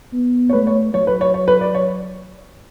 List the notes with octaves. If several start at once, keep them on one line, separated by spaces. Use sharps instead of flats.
B3
C#5
A3 B4
C#5
F#3 C#5
B4
C#5
C#5
B4
D5
C#5